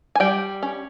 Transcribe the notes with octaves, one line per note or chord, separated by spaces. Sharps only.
G#5
G3 G5
C#4